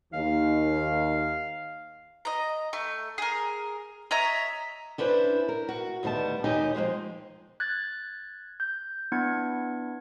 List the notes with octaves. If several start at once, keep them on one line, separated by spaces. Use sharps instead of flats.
D#2 F5
D#5 A#5
A3
G#4 A#4
C#5 D#5 E5 A#5
C#4 D4 E4 B4 C5
A#4
F#4
D2 D#3 G3 B3 A5
D#2 B2 D#4 G4 D#5 G#5
F3 F#3 G#3 A#3
F#6 G#6 A6
G6
B3 D4 E4 G#6 C#7